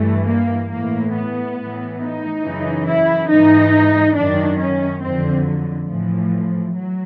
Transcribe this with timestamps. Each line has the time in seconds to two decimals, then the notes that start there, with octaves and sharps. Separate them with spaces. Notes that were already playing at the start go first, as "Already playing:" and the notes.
Already playing: G2 E3 A3
0.28 A#3
0.71 A2 E3 A#3
1.15 B3
1.57 A2 E3
2.00 D#4
2.44 F#2 C#3 E3
2.87 E4
3.30 G#2 E3 D#4
4.16 F#2 D#3 D4
4.59 C#4
5.03 F2 D3 C4
5.47 F#3
5.89 A2 E3 F3
6.75 F#3